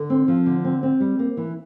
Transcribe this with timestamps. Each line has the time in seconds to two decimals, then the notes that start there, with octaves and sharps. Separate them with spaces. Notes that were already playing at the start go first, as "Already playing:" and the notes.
Already playing: D3
0.10 C4
0.28 F3
0.46 D3
0.64 C4
0.83 C4
1.00 G3
1.19 A#3
1.37 E3